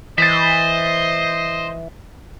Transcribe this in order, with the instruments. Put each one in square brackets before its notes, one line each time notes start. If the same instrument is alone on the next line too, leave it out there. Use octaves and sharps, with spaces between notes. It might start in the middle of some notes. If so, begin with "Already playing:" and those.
[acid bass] E3 [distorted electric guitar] C5 [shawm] D#5 [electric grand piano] A6 B6